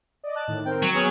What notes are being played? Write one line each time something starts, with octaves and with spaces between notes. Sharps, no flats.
D5 D#5
A5 F#6
A2 D#3
D#3 C4 A#4 G5
F#3
B3 C#4 G#4 D#7